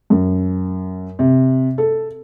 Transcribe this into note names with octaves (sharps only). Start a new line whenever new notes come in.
F#2
C3
A4